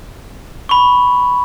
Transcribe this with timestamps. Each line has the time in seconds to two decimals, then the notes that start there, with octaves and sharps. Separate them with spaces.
0.69 B5 C#6